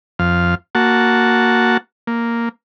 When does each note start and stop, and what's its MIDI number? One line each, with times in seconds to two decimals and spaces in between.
0.19 0.55 41
0.19 0.55 77
0.75 1.77 58
0.75 1.77 66
0.75 1.77 78
0.75 1.77 81
2.07 2.49 58